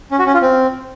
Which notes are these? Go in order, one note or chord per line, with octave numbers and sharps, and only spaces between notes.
C#4
F#4
C#4
F4
C4